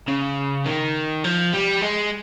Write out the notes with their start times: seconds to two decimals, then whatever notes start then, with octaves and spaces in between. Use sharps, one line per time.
0.08 C#3
0.66 D#3
1.24 F3
1.53 G3
1.81 G#3